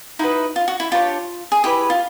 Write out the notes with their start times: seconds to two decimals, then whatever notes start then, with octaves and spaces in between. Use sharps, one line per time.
0.19 D#4 E4 F#4 B4
0.56 F4
0.68 F#4
0.80 E4
0.91 D4 F4 G4 A#4 C#5
1.52 G#4
1.64 E4 G4 G#4 B4
1.90 F4